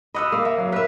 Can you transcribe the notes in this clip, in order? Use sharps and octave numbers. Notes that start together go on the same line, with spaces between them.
D#5 F#5 B5 D#6 E6
A#3
E5
F#3
A#4 B4 E5